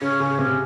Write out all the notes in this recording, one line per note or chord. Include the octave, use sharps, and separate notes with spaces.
C#3 C#4
C#3
C3